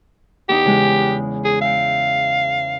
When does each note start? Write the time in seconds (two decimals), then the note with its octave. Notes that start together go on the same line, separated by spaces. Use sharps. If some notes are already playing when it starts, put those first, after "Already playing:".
0.49 E2 D#4 G4
0.65 C#3 E3 G#3
1.45 G#4
1.61 E5 F5 G5